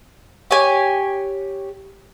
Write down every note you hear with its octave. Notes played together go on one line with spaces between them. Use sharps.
G4 C#5 G#5